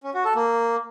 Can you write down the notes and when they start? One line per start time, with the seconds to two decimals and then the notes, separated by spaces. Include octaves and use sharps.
0.03 C#4
0.14 F#4
0.25 A4
0.35 A#3